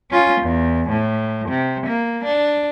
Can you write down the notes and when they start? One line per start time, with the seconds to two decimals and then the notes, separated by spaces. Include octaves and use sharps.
0.10 C#4 F4
0.41 E2
0.90 A2
1.49 C3
1.86 A#3
2.24 D4